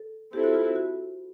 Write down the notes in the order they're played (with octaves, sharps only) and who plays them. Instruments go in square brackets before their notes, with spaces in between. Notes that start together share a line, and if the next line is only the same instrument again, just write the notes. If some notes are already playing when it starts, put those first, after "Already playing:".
Already playing: [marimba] A4
[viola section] C4 E4 A4 [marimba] G4
[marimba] F#4
F4
F#4
F#4